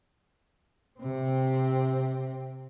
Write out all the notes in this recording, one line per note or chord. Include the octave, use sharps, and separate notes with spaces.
C3 C4